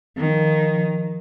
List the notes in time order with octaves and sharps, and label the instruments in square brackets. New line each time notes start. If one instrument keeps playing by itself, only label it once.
[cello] D#3 F3